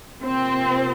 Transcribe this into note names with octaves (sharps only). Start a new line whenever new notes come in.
C3 F3 A#3 C4